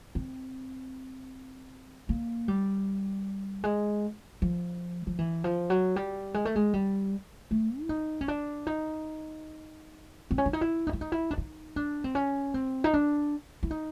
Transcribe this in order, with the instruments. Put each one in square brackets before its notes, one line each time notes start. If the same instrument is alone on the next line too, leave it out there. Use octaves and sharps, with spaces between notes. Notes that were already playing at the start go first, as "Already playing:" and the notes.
[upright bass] C4
A#3
G3
G#3
F3
F3
E3
F3
F#3
G3
G#3
A3
G#3
G3
A3
E4
D#4
C#4
D4
D#4
C4
C#4
D4
D#4
E4
D#4
E4
D#4
E4
D4
D#4
D4
C4
C#4
C4
D#4
D4
E4
D#4